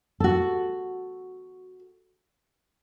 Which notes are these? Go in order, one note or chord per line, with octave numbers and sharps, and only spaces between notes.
F#4 A4